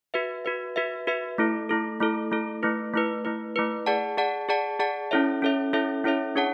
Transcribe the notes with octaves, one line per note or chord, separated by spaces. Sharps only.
F#4 B4 E5
F#4 B4 E5
F#4 B4 E5
F#4 B4 E5
A3 E4 A4
A3 E4 A4
A3 E4 A4
A3 E4 A4
A3 E4 B4
A3 E4 B4
A3 E4 B4
A3 E4 B4
G#4 D5 F#5 A5
G#4 D5 F#5 A5
G#4 D5 F#5 A5
G#4 D5 F#5 A5
C#4 E4 A4 C#5 E5
C#4 E4 A4 C#5 E5
C#4 E4 A4 C#5 E5
C#4 E4 A4 C#5 E5
D4 G#4 C#5 F#5 A5